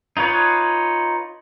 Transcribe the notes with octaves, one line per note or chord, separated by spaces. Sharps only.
D#4 F4 B4 C#5